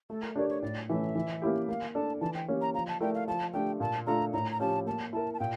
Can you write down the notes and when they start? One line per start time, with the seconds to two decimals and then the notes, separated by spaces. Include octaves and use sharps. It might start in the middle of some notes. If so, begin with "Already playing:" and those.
0.10 A3 A4
0.22 A#4
0.36 D4 G4 A#4 C#5 D5
0.49 C#5
0.62 A2 D5
0.89 E3 A3 C#4 E5
1.16 E3
1.42 A#3 C#4 E4 G4
1.68 A#3 F5
1.94 D4 A4 D5 A5
2.21 E3 A5
2.35 G5
2.48 A#3 C#4 G4
2.62 A#5
2.74 F3 A#5
2.88 A5
3.00 A3 E4 A#4 D5 G5
3.15 F5
3.28 F3 A5
3.53 A3 D4 G4 G5
3.80 A#2 A5
4.07 A3 D4 F4 A4 A#5
4.33 A2 A#5
4.52 A#5
4.60 F3 C#4 G4 A5
4.86 A#3 A5
5.13 E4 A#4 A5
5.34 A5
5.40 A#2 G5